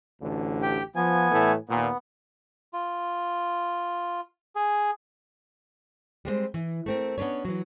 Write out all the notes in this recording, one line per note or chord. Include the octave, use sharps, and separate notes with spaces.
A1 D2 D3
G4 G5
F3 B3 G#5
A2 E3 A3
D#2 A#2 B3
F4
G#4
G3 G#3 A#3 C4
E3
A3 C4 A#4
B3 C#4 D4 B4 C#5
E3 F#3